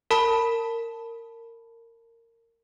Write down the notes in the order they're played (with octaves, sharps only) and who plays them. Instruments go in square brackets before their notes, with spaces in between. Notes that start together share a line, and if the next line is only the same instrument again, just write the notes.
[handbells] A#4 A5 B5